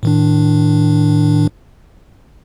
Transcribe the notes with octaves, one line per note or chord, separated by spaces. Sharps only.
A2 D#3 D4